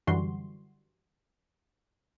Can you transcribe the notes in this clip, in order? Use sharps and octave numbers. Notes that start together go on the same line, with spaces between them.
F#2 D3 E3 G3 F#4 C6